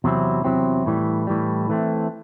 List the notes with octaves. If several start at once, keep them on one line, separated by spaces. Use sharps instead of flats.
E2 C3 F#3 C4 E4
E2 C3 F#3 C4 E4
A2 E3 G3
A2 E3 G3
E3 A3 C4